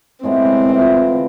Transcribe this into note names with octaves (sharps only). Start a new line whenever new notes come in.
A2 G#3 B3 C4
E3 B3 F4
D3